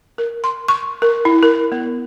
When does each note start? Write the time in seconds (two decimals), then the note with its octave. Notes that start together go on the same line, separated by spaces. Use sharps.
0.18 A#4
0.44 C6
0.68 C#6
1.02 A#4
1.25 E4
1.43 A#4
1.72 B3